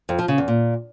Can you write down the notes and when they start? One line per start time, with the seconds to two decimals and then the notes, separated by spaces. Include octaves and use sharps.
0.09 F2
0.19 F3
0.28 C#3
0.38 E2
0.48 A#2